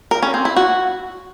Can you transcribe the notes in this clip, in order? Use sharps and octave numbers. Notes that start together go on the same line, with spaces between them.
A#4
C#4
C4
E4
F#4